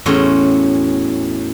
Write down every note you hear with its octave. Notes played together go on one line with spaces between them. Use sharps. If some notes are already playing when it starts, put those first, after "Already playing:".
E2 A2 C#4 F#4 C6